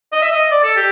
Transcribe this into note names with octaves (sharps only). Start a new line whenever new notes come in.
D#5
E5
D#5
D5
A4
G4